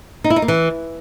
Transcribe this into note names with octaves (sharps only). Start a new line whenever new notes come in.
D#4
E4
D#4
A#3
E3